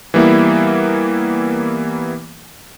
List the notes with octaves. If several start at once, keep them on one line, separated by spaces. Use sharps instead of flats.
E3 G3 A#3 B3 E4